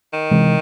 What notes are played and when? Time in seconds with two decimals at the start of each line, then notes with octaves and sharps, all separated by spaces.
0.13 D#3
0.31 C3 E3 G#3